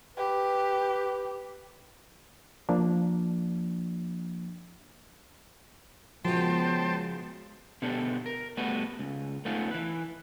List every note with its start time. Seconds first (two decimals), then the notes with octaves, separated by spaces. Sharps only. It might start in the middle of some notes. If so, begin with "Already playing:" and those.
0.17 G4 B4
2.69 F3 A#3 D4
6.25 F#2 C#3 F3 G#3 B3 C5 G5 A5
7.82 B2 D3 B3 D4 G4 A4
8.26 A#4
8.57 G3 A3 B3 F#4 B4
8.99 C#2
9.45 A3 B3 C#4 D#4 F4
9.71 E3 B4